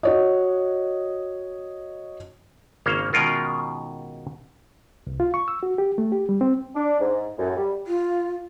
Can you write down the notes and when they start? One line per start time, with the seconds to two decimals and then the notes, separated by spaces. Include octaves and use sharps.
0.03 F#4 C#5 D#5
2.86 G#1 C#3 A#3 C#4 C5 F5
3.13 B2 D#3 G#3 C#4 F4 A#4
5.07 C2
5.20 F4
5.34 C#6
5.48 E6
5.63 F#4
5.78 G4
5.98 A3
6.12 G4
6.29 G3
6.41 C4
6.76 D4
7.00 G#2
7.38 F#2 A2
7.56 G3
7.87 F4